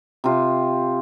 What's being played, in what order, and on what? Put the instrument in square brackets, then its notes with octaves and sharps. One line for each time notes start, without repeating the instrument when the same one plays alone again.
[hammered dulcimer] C3 F4